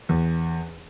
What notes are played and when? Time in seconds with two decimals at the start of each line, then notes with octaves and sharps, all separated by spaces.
0.09 E2